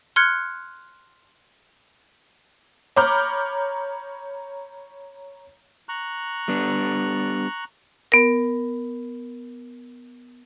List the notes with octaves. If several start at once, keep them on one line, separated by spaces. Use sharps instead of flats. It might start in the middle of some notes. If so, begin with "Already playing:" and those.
C6 F6 F#6 G#6 C#7
C#5 A#5 B5 D6 F6 G6
A#5 C#6 F#6
G3 B3 D4
B3 A#4